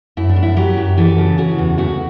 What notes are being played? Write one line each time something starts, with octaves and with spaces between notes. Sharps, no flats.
F#2 E4
D4
F#2
E4
F#3 G4
F#2
E3 A4
C#3
C#3 F#4
E2
D2 F#4